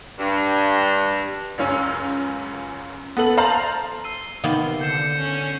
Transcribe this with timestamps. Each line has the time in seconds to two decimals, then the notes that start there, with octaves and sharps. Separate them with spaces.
0.20 G2
1.58 C#2 F#2 C#4
3.17 B3 A4 F#7
3.37 C5 F5 A5 A#5 F#7
4.04 E6 C7 D#7
4.44 C3 D#3 A#3 B3
4.81 D3 G6 C7 C#7 E7
5.19 C#4